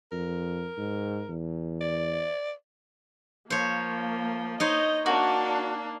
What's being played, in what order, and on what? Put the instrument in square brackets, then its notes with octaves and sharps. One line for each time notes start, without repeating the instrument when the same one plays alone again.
[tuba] F2 [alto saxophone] A#4
[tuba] G#2
E2
[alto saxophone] D5
[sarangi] F3 [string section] A#3 [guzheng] C5 C#5
[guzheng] D#4 C5 C#5 [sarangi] D#5
[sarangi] A#3 [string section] D4 [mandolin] F#4